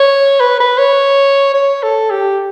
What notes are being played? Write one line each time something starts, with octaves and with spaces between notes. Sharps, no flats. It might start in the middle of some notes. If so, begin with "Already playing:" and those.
Already playing: C#5
B4
B4
C#5
C#5
A4
G4